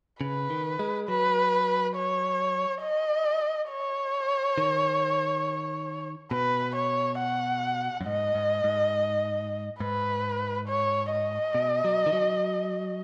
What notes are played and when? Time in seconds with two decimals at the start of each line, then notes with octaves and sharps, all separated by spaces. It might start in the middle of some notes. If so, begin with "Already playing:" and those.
0.21 C#3 B4
0.50 D#3
0.79 G#3
1.08 F#3 B4
1.96 C#5
2.82 D#5
3.70 C#5
4.58 D#3
6.31 B2 B4
6.75 C#5
7.19 F#5
8.01 F#2
8.06 G#2 D#5
8.35 G#2
8.64 G#2
9.80 G#2 B4
10.68 C#5
11.11 D#5
11.55 B2
11.84 F#3
12.06 D#3
12.13 F#3